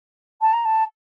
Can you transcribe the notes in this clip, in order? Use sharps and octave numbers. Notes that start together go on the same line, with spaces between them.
A5
A#5
A5